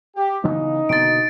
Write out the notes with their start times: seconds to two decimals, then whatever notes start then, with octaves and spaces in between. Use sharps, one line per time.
0.15 G4
0.44 C#3 E3 B3 D#4
0.89 B2 D3 A#3 A6 D7